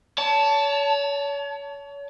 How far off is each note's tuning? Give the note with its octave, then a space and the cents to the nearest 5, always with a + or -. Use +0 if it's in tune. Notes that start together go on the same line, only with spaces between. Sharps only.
C#5 +35 A5 +0